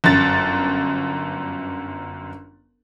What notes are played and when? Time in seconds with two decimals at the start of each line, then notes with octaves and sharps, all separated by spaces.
0.04 G1 F#2 A6